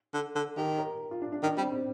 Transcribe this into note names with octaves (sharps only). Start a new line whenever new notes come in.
D3
D3
D#3 G4
A#4
F4
D4
D4
D#3 D4
G3 C4
C4